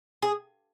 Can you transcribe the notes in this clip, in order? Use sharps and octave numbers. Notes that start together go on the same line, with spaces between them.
G#4